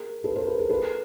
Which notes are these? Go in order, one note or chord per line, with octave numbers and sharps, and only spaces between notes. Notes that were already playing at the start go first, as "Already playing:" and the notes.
Already playing: G#4 A#4
A4 B4
A#4 C5
A4 B4
G#4 A#4
A4 B4